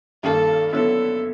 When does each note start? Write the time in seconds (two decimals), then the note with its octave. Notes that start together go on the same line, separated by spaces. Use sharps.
0.23 G2 D#3 G3 A#3 A4
0.73 D3 F#3 B3 E4 A4